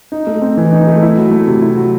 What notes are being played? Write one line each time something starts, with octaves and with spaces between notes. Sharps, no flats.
D#4
A3
C4
E3
D#4
A3
E4
F#3
A3
C3
E4
F#3